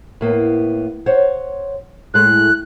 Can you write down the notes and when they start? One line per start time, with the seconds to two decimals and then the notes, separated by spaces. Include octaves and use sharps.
0.21 A2 A#3 B3
1.06 C5 C#5 F#5
2.14 A2 G#3 A3 F#6